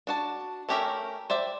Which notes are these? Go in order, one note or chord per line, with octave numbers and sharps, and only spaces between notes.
D4 F#4 A5
A3 C#4 G4 A#4 E5
C5 D5 E5 G5